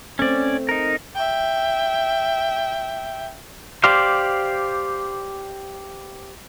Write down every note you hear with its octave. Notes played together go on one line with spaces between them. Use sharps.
A3 C4 C#4 D5
D#4 A#4
E5 G5
G4 C5 D5 F5